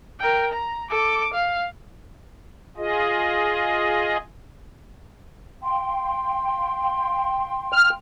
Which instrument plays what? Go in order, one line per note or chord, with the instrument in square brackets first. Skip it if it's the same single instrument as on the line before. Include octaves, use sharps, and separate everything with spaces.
[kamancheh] A#4 G5
A#5
A4 D6
F5
[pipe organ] F4 G#4 D#5
[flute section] F5 G5 C6
[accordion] F6